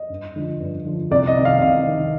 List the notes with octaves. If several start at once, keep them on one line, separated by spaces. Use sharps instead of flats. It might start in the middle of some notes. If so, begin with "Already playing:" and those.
Already playing: D#5
G2
D3 F3
G2
D3 F3
C2 D5
D#5
C3 D#3
F5
C2 F5
C3 D#3